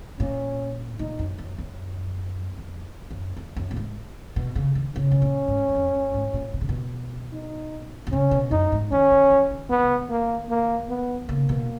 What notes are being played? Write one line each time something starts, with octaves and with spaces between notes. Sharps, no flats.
A#2 C#4
A#2 D#4
F#2
F#2
F#2
F2
F#2
F2
F#2
A#2
G#2
B2
C#3
D#3
C#3 C#4
B2
A#2
G#2
F#2
F2
F#2
G#2
A#2
B2
C#3
B2
D#4
B2
C#3 C#4
B2
F#2 D#4
G#2
D#3 C#4
D#3
F3
D#3
D#3 B3
C#3
D#3
A#3
A#3
B3
C#3 A#3
B2